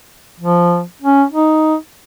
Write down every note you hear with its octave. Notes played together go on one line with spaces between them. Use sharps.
F3
C#4
D#4